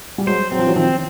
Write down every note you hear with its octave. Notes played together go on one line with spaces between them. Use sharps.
G3
F#3 G#3 C5
F#3 C4
F3
E3 F#3
D#3 F3 C4